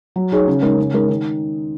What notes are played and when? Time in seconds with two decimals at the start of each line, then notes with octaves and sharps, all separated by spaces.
0.16 F#3
0.32 D#4 G#4 C#5
0.48 C#3
0.62 G#3 D#4 A#4
0.78 C#3
0.94 G#3 D#4 A#4
1.09 D#3